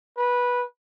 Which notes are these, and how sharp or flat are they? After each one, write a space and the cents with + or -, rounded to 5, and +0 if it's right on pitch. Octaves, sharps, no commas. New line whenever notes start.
B4 -15